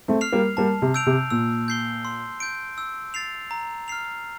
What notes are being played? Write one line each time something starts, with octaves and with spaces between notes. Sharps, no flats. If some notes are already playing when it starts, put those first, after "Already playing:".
A3 C4
F6 C7 F7
G3 A#3
G3 A#3 A5
C3
E6 G6 D7 F7
C3
A#2 E6
G6 C7 G7
C6
G6 D7
E6
A6 C7 F7
A#5
F6 C7 F7